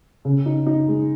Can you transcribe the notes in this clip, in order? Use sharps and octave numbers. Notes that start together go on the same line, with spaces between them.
C#3
D#4
D#4
G#3